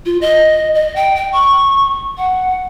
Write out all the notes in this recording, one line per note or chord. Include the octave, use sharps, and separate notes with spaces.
F4
D#5
D#5
G5
G5
C#6
F#5